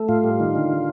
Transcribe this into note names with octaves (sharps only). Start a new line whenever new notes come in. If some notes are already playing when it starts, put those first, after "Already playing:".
Already playing: A3
A2 F4
G3
D#3
D3